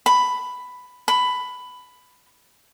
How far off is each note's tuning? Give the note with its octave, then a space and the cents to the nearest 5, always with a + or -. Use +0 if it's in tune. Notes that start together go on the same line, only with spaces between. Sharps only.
B5 +5
B5 +10